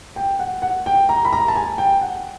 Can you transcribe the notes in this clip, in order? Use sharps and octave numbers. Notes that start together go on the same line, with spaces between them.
G5
F#5
F#5
G5
A#5
B5
A#5
A5
G#5
G5
F#5